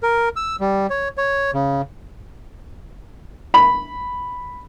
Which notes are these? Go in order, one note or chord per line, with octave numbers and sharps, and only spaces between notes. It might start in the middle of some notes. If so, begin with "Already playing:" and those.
A#4
E6
G3
C#5
C#5
C#3
B5